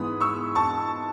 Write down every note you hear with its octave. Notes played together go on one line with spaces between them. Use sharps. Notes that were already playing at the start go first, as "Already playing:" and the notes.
Already playing: G#2 E3 G#3 B3 B5 D#6
C#6 E6
A5 C#6